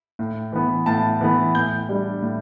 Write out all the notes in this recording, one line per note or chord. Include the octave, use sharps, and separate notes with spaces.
A2
E3 B3
A2 A5
E3 B3
A2 G6
G3 D4
A2